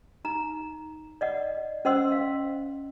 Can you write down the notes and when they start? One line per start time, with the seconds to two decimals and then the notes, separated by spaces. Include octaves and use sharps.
0.25 D#4 A#5
1.21 D5 D#5 F#5
1.85 C#4 C5 D#5 F#5 C6 E6
2.12 F5